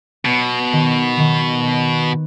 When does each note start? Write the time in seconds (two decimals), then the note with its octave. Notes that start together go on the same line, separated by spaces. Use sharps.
0.25 B2 B3
0.73 D#3
1.20 D#3
1.67 B3